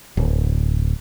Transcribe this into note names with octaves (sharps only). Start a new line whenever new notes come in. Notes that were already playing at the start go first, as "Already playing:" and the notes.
D1